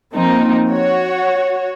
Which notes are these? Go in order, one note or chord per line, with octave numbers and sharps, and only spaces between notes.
F3 A#3 C4 D#4
F#4 C#5